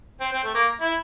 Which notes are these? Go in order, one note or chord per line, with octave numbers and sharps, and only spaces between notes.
C4
C4
A3
A#3
E4